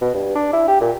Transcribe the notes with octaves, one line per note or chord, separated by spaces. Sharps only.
B2
G2
D4
E4
G4
A#2